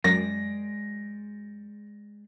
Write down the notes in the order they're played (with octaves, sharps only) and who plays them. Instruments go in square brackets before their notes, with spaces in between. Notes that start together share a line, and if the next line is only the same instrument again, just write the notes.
[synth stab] F#2 [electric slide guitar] G#3 D5 [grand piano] A#6